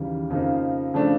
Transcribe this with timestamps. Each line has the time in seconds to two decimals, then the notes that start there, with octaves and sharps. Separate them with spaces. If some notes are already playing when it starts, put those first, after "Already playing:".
Already playing: D#2 C#3 E3 G3
0.30 F2 C#3 F3 A#3 D#4
0.94 C#3 F3 A3 D4